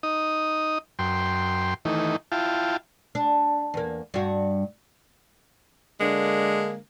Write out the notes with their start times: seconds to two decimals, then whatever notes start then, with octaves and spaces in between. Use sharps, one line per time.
0.03 D#4 D#6
0.99 F#2 G5 C6
1.85 D#3 E3 A3 D#4
2.32 E4 F4 F5 G5 A5
3.15 D4
3.74 E2 A#3
4.14 G2 F#4
6.00 D3 G#3 A#3 D4